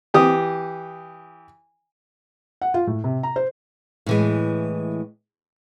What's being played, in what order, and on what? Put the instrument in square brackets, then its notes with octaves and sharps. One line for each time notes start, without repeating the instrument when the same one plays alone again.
[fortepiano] E3 G4 D#6
[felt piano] F#5
F4
A2
C3
A#5
C5
[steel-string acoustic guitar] A2 E3 G#3